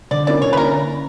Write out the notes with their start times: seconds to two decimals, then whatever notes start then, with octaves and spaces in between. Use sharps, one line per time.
0.11 D3 D5
0.27 A#3 C#4 E4 D5
0.42 D3 C#5
0.53 B4
0.56 A#3 C#4 E4 A#4